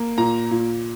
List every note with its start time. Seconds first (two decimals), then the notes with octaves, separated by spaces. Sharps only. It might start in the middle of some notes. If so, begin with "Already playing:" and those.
Already playing: A#3
0.18 A#2 A#5
0.51 A#2